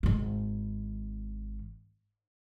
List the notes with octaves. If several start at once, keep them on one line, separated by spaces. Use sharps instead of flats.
G#1 D#3